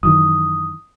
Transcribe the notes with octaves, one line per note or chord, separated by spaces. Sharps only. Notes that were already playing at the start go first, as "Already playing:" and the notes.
F#2 D#3 E3 D#6